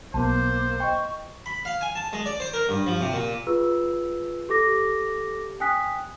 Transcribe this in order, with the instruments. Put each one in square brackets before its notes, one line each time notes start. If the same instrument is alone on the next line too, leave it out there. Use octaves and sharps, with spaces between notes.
[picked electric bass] B1 B3 [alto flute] A#3 [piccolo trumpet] C5 [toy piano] A5
[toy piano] D#5 G5 [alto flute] C#6
[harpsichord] B5
F5
G#5
A5
G#3
D5
C5
A#4
G2
F3
C3
A#2
[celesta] F4 G#4 B4 E6
G4 A4 D6 A#6
G5 G#5 D#6 F#6 B6